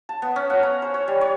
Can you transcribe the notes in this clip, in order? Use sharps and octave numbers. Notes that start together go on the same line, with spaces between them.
A5
B3
C#4
F#5
A#5
C5
C#5
G3
C#5